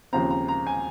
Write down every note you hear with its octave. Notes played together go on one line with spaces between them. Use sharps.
D#2 C#3 F3 C4 A#5
A#5
A#5
G#5